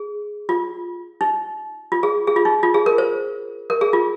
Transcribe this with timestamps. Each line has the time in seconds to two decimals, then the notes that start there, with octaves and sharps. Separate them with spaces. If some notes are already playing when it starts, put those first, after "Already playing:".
Already playing: G#4
0.49 F4
1.21 D#4
1.92 F4
2.03 G#4
2.27 G#4
2.36 F4
2.45 D#4
2.63 F4
2.74 G#4
2.86 A#4
2.98 C5
3.70 A#4
3.81 G#4
3.93 F4